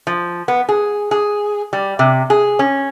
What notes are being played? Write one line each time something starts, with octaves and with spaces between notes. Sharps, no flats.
F3
B3
G#4
G#4
G3
C3
G#4
C#4